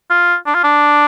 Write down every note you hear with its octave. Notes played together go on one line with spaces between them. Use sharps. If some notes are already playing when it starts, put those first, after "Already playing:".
F4
D4
F4
D4